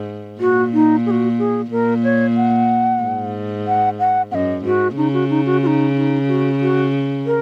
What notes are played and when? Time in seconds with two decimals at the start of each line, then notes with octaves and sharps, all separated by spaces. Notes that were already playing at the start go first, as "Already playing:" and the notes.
Already playing: G#2
0.40 A#2 F#4
0.73 D#4
1.06 G#4
1.11 F#4
1.39 G#4
1.71 A#2 A#4
2.04 C#5
2.36 F#5
3.02 G#2
3.67 F#5
3.99 F#5
4.31 F#2 D#5 F#5
4.65 G#2 F#4
4.97 C#3 D#4
5.13 F#4
5.30 D#4
5.46 F#4
5.62 F#4
5.66 D#4
5.96 D#4
6.28 F#4
6.61 F#4
7.26 A#4